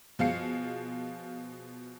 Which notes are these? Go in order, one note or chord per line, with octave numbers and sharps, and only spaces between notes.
B2 F3 G#4 F5 C7 C#7